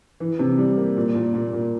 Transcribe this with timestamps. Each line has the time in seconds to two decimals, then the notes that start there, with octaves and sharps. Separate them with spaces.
0.20 E3
0.39 C3
0.58 G3
0.77 A#3
0.97 A#2
1.15 A#2
1.34 A#2
1.53 A#2